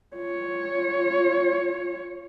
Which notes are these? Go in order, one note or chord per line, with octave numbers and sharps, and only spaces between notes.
F4 C#5